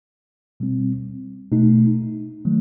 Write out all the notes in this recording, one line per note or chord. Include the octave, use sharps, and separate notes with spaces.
B2 G3 C4
B2 A3 D#4
D#3 F#3 A3